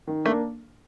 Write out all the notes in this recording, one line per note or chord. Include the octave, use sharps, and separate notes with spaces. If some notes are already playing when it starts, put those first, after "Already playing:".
D#3
A3 A#3 D4